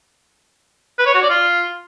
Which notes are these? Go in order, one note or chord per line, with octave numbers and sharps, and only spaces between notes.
B4
C#5
F#4
D5
F4